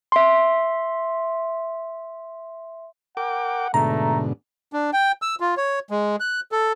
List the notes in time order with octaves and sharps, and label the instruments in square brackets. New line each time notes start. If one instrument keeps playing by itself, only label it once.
[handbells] E5 C6
[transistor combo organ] A#4 G5 D6 [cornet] F#5
[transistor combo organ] G#2 B2 D3 [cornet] A3 [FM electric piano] A#5
[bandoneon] D4
G5
E6
F4
C#5
G#3
F#6
A4